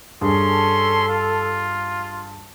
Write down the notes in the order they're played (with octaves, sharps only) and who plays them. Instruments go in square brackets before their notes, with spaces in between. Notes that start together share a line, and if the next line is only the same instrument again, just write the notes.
[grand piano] G2 G#4 [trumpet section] C#4 C6 [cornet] A4
[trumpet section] F4